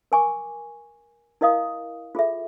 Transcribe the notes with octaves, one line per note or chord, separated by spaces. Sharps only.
A#4 G#5 C#6 D6
E4 A#4 D#5 F5 D#6
F4 G#4 A4 E5